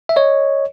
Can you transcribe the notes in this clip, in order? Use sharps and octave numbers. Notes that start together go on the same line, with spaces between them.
E5
C#5 D#5